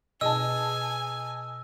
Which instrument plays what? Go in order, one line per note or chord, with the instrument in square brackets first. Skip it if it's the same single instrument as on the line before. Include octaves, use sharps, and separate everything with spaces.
[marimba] B2 G#4 [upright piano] D#5 A5 [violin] G#5 [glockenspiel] E6